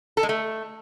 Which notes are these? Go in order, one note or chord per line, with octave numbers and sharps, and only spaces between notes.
A4
G#3
A3